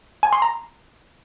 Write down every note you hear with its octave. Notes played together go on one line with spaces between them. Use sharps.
G#5
C6
A#5